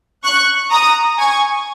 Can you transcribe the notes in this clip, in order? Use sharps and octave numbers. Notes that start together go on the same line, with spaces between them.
C#6 F#6
A#5 D#6
G#5 C#6